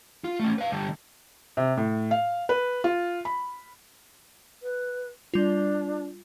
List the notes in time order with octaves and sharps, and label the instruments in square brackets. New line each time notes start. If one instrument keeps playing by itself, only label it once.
[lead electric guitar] F4
A3 C#4
B4 F5
D3 G3
[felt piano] C3
A2
F5
B4
F4
B5
[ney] B4
[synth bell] G3 F4 [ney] D4